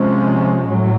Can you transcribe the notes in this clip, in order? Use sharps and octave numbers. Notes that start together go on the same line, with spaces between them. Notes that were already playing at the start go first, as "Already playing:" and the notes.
Already playing: C3 F3 G#3 C#4
A2 F#3